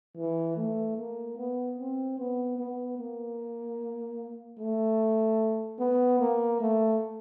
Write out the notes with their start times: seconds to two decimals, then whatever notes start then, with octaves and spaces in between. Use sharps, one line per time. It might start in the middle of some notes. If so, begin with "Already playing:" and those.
0.17 E3
0.56 A3
0.97 A#3
1.37 B3
1.78 C4
2.18 B3
2.59 B3
2.98 A#3
4.59 A3
5.79 B3
6.20 A#3
6.60 A3